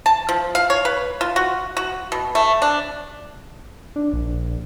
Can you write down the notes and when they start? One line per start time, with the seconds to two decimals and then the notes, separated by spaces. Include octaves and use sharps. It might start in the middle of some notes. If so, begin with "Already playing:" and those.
0.06 A5
0.29 F3
0.55 F5
0.70 C#5
0.85 B4
1.21 F4
1.36 F#4
1.77 F#4
2.12 B2
2.35 A3
2.62 D4
3.96 D4
4.13 A#1